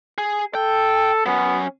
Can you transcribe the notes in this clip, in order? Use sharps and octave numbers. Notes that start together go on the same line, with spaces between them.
G#4
A4 G5
F#3 B3 C#4